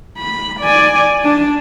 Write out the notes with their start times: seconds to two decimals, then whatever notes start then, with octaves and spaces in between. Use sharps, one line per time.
0.17 B5
0.61 D5 G#5
1.24 D4 A5